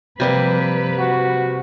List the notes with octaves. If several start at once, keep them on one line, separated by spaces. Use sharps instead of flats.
C3 F3 G3 A#3 B4
F#4